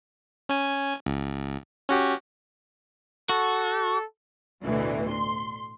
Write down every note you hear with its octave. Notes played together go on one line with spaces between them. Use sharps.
C#4 G#5
C#2
C#4 F#4 G4
F#4 A4
A1 D2 B2 E3
C6